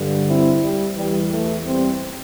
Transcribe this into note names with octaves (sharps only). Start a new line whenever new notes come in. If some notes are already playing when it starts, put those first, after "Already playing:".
Already playing: G2 D3
C4 E4
G3
E2 E3 G3
E3 A3
G3 C4